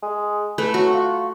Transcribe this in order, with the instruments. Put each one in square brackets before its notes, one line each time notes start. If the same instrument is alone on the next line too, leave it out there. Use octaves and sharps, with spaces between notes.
[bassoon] G#3
[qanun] A3 [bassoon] B4
[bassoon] F#3 [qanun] F#4
[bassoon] F4